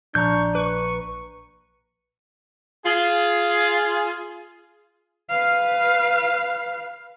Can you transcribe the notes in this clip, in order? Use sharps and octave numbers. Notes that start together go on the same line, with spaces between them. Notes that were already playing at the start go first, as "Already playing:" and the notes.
A#1 D4 A#5 C#6 G6
B4 C#6
F4 G#4
B4 F5